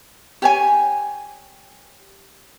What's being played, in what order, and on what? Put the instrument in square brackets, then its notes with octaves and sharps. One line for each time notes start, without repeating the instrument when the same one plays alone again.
[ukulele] G4 C#5 G#5